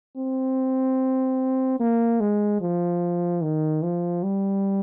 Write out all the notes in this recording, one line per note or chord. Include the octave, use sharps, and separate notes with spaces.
C4
A#3
G#3
F3
D#3
F3
G3